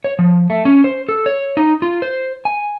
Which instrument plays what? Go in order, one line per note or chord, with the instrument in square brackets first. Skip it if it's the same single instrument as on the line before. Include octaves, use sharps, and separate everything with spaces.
[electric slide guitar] C#5
F3
A3
C#4
C5
A4
C#5
D#4
F4
C5
G#5